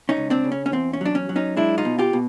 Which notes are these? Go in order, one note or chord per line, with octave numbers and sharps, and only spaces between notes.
C#4 D#4
C#2
C4 D4
C#3
C#4
C#4
E2 C4
C#4
F#3 D4
C#4
F#3
C#4 D#4
G#3 D4 E4
D#4 F4
B2
F4 G4
B2